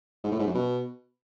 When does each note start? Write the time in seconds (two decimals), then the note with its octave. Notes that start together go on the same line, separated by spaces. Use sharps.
0.24 G#2
0.32 A2
0.39 G#2
0.47 F#2
0.55 B2